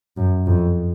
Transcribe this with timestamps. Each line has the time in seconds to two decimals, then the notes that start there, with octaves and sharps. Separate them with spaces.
0.17 F#2
0.46 F2